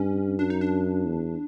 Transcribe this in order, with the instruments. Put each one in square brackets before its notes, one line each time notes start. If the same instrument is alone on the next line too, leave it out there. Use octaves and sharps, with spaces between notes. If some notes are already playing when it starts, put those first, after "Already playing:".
Already playing: [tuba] G2 [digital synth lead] C#4
[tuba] F#2 [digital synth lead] D4
[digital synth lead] D#4
D4
[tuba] E2